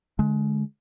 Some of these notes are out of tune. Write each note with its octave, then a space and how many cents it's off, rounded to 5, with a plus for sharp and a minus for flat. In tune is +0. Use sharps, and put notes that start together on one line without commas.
D3 +0 G#3 +25